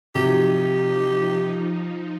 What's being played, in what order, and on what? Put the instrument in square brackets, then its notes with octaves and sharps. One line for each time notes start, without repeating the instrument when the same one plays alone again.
[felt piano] C3 F#3 [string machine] F3 D#4 [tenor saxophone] G4